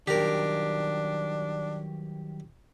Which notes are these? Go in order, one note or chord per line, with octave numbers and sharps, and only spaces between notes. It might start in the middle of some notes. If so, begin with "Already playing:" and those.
D#3 F#3 G3 D4 G4 A#4